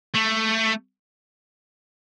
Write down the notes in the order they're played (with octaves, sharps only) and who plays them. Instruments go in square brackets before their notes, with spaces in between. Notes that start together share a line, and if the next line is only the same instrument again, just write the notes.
[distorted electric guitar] A3